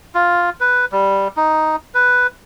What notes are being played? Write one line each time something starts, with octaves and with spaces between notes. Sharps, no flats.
F4
B4
G3
D#4
B4